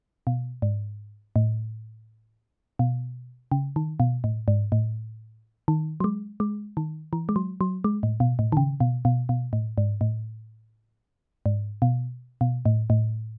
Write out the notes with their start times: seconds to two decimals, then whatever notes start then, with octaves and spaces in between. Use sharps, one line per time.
0.27 B2
0.62 G#2
1.36 A2
2.79 B2
3.52 C#3
3.76 D#3
4.00 B2
4.24 A2
4.48 G#2
4.72 A2
5.68 D#3
6.00 F#3
6.04 G#3
6.40 G#3
6.77 D#3
7.13 E3
7.29 G#3
7.36 F#3
7.61 F#3
7.84 G#3
8.03 A2
8.20 B2
8.39 A2
8.52 D#3
8.57 C#3
8.80 B2
9.05 B2
9.29 B2
9.53 A2
9.78 G#2
10.01 A2
11.46 G#2
11.82 B2
12.41 B2
12.66 A2
12.90 A2